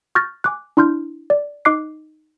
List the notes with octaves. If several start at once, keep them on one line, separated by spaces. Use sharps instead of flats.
C#6 F6 G6 A6 A#6
G#5 D6 F#6
D4 E4 C6 F6 G6
D5
D#4 D#5 D6 F#6 C7